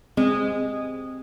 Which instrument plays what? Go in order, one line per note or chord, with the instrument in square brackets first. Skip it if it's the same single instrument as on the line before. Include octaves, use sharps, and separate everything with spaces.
[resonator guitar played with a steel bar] G#3 [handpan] C4